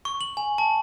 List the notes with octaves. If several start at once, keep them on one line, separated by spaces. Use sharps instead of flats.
C#6
F#7
G#5
A5